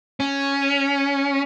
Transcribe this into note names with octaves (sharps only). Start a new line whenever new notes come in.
C#4